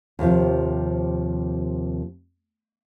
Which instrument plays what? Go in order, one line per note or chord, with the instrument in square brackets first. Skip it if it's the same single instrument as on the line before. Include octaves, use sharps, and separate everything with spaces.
[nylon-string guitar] D#2 C3 F3